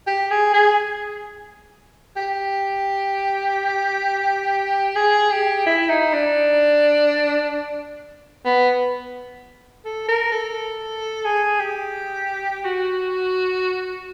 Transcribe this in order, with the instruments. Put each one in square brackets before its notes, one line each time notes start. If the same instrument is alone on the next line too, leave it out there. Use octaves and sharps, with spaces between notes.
[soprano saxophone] G4
G#4
G#4
G4
G#4
G4
E4
D#4
D4
B3
A4
A#4
A4
G#4
G4
F#4